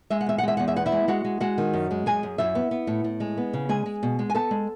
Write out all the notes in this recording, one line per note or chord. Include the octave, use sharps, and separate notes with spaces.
G#3 E5
F#5
E2 E5
F#5
G#3 E5
E2 F#5
E5
B3 F#5
E4 E5
G#3
G#3 F#4 F#5
G#3
G#3 F#4 F#5
D#3
F#2
G#3
F#2 G#4 G#5
F#2
F#2 E4 E5
B3
B3
A2
A2
G#3
B3
C#3
G#3 G#4 G#5
G#3
B2
G#3
G#5
B3 A4 A5
G#3